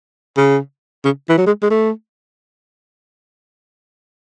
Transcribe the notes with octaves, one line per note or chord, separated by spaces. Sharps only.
C#3
C#3
E3
F#3
G#3
G#3
A3